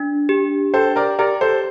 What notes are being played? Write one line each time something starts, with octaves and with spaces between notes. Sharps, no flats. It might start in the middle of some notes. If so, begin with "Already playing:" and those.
Already playing: D4
G4
A4 C5 G5
A#4 D5
G4 A#4 D5
A4 C5